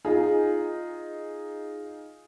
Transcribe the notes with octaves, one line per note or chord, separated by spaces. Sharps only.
D#4 F4 G#4